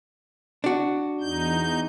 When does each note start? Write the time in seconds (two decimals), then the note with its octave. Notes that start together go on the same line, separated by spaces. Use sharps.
0.64 D4 F#4
1.20 E2 D#4 G6